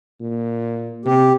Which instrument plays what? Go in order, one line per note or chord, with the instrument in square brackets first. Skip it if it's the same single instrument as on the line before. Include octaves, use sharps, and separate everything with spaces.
[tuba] A#2
[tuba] C3 [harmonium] G4